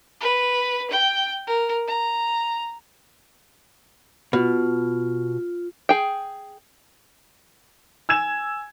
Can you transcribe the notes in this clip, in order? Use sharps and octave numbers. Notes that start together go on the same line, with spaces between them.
B4
G5
A#4
A#5
B2 F4
G#4 G5
G#5 E6 G#6 E7